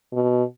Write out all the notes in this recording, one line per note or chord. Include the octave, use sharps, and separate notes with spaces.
B2